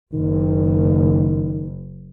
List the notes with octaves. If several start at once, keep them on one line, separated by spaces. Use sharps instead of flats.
F#1 D#3